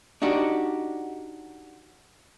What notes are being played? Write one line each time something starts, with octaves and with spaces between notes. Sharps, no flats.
D4 D#4 F#4 G4